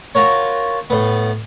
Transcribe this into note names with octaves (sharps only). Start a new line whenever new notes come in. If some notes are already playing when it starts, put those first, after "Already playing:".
F4 F#4 A#4 C#5
A2 B3